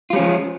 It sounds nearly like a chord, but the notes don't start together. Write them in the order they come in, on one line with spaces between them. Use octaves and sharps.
F4 G3 C#4 F3 G#3